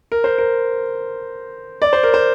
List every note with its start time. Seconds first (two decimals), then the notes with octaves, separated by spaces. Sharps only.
0.12 A#4
0.24 C5
0.38 A#4
1.82 D5
1.93 C5
2.03 A#4
2.14 C5